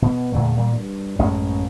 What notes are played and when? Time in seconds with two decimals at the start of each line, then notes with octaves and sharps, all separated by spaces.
0.02 B2
0.32 E2 A#2 D3 A3
0.57 A#2 E3 G3
0.73 G2
1.19 A1 F#2 G#3 C#4